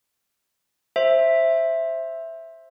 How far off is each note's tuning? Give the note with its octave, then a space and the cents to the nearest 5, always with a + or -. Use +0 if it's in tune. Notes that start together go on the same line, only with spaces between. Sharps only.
C5 +15 E5 +0